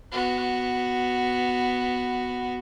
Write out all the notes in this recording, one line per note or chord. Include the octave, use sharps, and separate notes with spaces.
B3 F#4